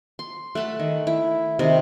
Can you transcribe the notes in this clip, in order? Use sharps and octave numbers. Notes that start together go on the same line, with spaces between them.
C6
A3 F#5 A5 B5
D#3
E4
C3 D#3